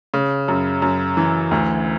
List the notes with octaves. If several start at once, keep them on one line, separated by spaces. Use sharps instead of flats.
C#3
F#2
F#2
E3
D2